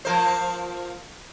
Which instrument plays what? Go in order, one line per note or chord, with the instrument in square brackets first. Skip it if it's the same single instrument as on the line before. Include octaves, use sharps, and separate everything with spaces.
[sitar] F3 A#3 C5